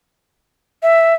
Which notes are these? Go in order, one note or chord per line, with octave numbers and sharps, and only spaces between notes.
E5